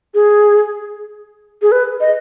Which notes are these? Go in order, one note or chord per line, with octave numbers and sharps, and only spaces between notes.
G#4
G#4
B4
D#5